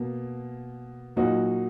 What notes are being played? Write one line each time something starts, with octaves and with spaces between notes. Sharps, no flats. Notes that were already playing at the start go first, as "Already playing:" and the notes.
Already playing: B2 A#3
A#2 F#3 A#3 D#4 F#4